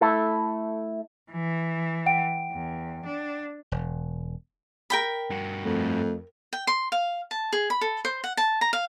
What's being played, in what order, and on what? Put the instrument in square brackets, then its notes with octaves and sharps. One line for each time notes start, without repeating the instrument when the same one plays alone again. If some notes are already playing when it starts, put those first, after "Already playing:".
[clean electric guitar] A3 E4 A4
[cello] E3
[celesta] F#5 G5 D7
[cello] E2
D4
[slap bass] E1
[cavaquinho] A#4 G5 B5
[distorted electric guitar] G2 F#4
[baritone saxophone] F2 [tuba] A3
[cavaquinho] G5
C6
F5
A5
G#4
B5
A4
C5
F#5
A5
A#5
F5